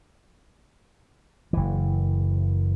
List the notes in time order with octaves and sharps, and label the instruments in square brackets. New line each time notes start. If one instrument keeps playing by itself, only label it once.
[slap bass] F#1 E3